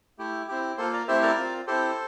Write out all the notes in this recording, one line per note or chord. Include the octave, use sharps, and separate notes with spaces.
A3 E4 G4
C4 E4 G4
A#3 F4 A4 C5
A#4 D5
A3 C4 E4 G4 C5 E5
A#4 D5
C4 F4
C4 E4 G4 A4 C5